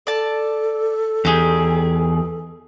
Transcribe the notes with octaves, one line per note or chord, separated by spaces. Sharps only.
A4 D5 A5
E2 D#4 G4 G#4